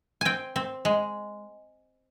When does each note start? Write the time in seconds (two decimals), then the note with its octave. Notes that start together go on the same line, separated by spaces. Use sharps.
0.21 C4 G5 G#5
0.56 C4
0.85 G#3